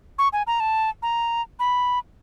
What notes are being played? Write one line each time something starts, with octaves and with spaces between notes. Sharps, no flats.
C#6
G#5
A#5
A5
A#5
B5